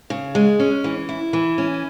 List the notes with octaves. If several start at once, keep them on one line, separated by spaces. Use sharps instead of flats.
C#3
G#3
C#4
E3
E4
E3
C#4